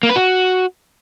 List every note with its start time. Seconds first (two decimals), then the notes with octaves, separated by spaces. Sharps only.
0.03 A#3
0.09 B4
0.16 F#4